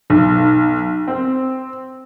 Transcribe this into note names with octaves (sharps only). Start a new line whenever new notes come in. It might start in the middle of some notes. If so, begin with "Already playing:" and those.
B1
C4